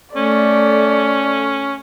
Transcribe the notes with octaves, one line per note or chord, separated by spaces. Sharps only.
A3 C#4 D5